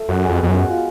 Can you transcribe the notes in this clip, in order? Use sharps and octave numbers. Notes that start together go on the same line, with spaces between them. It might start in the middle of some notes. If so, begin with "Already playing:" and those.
Already playing: A3
F#2 F#4
F2 G#3
F2 B3
F#2
F#4
F4